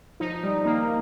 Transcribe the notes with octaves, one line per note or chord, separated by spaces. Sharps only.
F3 D#4
G3
D#3 A#3